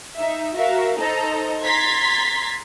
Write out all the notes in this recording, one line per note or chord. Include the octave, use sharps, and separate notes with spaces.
D#4 E5
F#4 A#4 E5 F5
D#4 A4 C5 D#5 A#5
A#5 C6 G#6 A6 B6